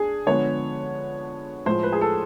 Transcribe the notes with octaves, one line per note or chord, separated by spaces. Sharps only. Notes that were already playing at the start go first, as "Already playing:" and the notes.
Already playing: D4 G#4
D3 F3 G#3 B3 C#5
A2 F3 G#3 C5
B4
G#4
A4